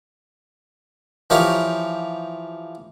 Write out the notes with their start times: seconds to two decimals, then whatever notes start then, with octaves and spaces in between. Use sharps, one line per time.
1.30 E3 F3 D#4 G4 A#4 C#5